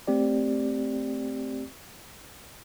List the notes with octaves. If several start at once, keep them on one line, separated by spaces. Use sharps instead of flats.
A3 C4 G4 D5